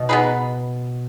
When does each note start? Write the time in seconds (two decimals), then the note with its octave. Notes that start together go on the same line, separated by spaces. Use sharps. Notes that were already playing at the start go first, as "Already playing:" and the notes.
Already playing: B2
0.09 B3 D#4 G#4 B4